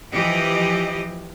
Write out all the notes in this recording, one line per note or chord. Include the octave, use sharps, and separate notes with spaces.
E3 F3 G4 D#5